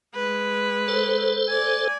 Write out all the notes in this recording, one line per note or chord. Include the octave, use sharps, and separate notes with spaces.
G#3 B4
A4 C5
D5 G#5